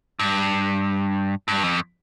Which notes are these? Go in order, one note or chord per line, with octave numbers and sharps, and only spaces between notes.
G2
G2
F2